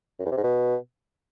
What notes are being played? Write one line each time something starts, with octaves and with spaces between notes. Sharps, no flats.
F#2
E2
C3
G#2
B2